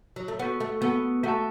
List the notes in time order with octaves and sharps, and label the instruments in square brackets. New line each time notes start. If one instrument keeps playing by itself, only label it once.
[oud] F#3
A3
[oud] B3 [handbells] F#4 A4 F#5
[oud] A3
[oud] B3 [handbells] F#4 A4 F#5
[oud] A3 [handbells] F#4 A4 F#5 A5